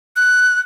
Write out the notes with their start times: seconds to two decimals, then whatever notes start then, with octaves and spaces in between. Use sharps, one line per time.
0.16 F#6